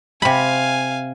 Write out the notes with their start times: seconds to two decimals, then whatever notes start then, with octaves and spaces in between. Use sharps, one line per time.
0.22 C3 F5 G#5 B5